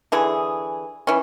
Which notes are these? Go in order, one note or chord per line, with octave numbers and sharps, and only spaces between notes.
D3 E3 G#4
E3 C#4